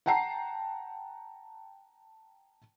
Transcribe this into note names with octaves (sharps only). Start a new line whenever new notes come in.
F#5 G5 A5 A#5 C7